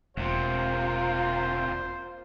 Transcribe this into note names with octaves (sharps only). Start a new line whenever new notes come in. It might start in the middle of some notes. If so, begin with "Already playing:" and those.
E1 D2 C3 A#3 F4 C5